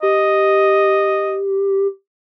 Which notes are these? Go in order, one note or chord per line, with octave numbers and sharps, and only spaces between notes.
G4 D#5